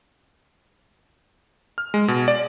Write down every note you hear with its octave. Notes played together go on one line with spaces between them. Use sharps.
F6
G#3
B2
D5